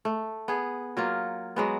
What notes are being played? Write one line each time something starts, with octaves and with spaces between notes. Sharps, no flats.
A3
B3 G#4
F#3 A#3 F4
F#3 G#3 B3